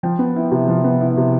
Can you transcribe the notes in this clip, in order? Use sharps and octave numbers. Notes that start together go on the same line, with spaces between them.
F3 G5
B3
E4
C3
F3
B3
E4
C3